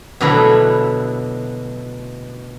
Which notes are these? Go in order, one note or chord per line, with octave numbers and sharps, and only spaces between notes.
B2 D3 F#3 A3 E4